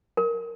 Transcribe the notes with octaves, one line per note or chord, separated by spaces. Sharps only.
A#4